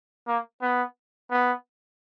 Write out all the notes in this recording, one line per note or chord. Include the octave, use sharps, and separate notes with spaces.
A#3
B3
B3